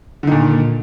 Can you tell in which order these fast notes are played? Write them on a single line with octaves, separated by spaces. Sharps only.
D3 D#3 A#2